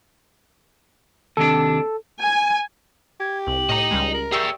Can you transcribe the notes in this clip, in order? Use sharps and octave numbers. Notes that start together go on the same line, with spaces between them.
D#2 C3 D4 A4
G#5
G4 G#6
C2 F#7
A2 D#5 A#5
C#2 G3 G#3
A#4
G4 G#4 D5 E5 C#6 E6